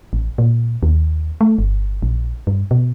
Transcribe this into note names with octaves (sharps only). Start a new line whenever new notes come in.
A1
A#2
D#2
A3
G1
A#1
G2
B2